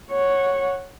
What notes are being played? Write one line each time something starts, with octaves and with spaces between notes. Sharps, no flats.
C#5 F#5